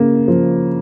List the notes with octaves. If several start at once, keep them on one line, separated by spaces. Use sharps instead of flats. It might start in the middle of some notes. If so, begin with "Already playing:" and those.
Already playing: C#3 A#3
F3